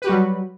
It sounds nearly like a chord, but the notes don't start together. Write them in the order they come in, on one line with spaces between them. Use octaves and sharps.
B4 G4 F#4 G3 F#3